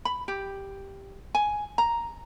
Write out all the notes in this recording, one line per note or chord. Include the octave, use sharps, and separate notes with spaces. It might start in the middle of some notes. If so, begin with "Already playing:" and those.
B5
G4
G#5
A#5